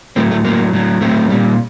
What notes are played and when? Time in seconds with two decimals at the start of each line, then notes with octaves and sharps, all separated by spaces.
0.16 A2 F#3 A3 C4
0.31 A3
0.45 A2 F#3 A#3
0.73 A2 F#3
1.01 A2 F#3 A3 C4
1.29 A#2 G3